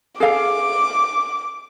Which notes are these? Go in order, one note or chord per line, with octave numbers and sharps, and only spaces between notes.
G#4 A4 F5 D6